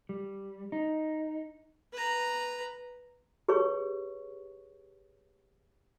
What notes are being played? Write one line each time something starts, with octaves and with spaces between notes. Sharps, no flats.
G3
D#4
B4 A#5
G4 G#4 B4 C#5 C#6